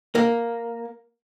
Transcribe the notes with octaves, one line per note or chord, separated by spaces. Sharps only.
A#3